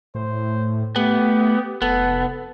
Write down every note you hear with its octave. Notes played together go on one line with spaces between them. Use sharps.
A2 C5
A3 B3 G4
F1 B3 A4